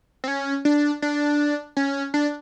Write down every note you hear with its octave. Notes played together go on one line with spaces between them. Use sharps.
C4
C#4
D4
D4
C#4
D4